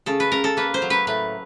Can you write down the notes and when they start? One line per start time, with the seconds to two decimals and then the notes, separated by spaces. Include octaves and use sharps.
0.06 C#3 A4
0.20 B4
0.32 C#3 A#4
0.44 A4
0.57 A#3 B4
0.74 C5
0.82 F#3
0.90 B4
1.07 A2 B4